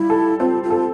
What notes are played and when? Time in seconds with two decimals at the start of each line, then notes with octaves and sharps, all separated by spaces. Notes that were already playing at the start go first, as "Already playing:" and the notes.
Already playing: G3 E4 F4
0.10 A4
0.40 C4 F4
0.64 F4
0.70 A4